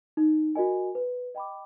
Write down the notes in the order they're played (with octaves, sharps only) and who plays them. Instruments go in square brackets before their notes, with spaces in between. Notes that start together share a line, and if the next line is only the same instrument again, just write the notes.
[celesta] D#4
F#4 A#4 D#5 G#5
B4
D#5 G5 B5 D6